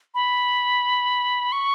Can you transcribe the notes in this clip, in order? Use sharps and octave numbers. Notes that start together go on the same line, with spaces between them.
B5
C#6